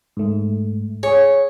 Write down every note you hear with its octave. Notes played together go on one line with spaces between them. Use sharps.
G#2 A3
G#4 C#5